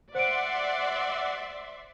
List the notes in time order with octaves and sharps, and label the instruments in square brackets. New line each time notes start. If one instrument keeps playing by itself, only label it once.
[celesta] C5 D7 [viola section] D5 E5 C6 [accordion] F#5